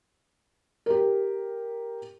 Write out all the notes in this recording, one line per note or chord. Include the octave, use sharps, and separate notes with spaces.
G4 A#4